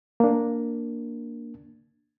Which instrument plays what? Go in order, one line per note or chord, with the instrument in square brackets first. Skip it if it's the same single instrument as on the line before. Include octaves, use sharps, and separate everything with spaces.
[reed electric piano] A#3 D4